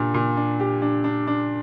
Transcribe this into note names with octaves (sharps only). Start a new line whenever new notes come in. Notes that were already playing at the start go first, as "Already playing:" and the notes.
Already playing: A#2 D4 G4
A#2
D4
G4
D4
D4
D4